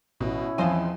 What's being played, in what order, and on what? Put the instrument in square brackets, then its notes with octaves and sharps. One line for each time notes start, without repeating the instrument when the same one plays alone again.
[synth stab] A1 [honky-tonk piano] B2 [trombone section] C#4 E4
[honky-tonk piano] E2 C4 [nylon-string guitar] F3 F5 G#5 [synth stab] F4 C5 D#5